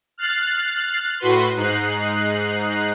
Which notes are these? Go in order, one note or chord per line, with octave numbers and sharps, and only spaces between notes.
F6 F#6 A6 C7
A2 F#4 B4 C6
G#2 D#4 F#6 C7